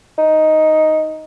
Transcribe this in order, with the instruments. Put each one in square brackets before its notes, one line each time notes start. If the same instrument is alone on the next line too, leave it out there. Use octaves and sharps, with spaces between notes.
[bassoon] D#4